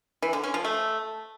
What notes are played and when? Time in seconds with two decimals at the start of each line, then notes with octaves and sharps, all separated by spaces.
0.22 E3
0.33 D3
0.43 C#4
0.54 F3
0.65 A3